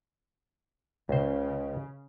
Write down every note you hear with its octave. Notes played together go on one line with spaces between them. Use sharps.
C#2 C#3 C5